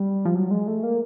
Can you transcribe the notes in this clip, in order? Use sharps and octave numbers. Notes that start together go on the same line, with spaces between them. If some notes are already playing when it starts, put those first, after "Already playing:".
Already playing: G3
F3
F#3
G#3
A3
A#3